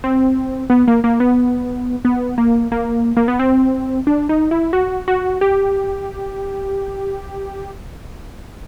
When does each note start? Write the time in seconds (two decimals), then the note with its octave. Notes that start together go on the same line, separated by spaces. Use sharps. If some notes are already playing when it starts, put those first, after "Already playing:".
0.04 C4
0.70 B3
0.88 A#3
1.04 A#3
1.20 B3
2.05 B3
2.38 A#3
2.72 A#3
3.17 A#3
3.28 B3
3.39 C4
4.07 D4
4.29 D#4
4.51 E4
4.73 F#4
5.08 F#4
5.41 G4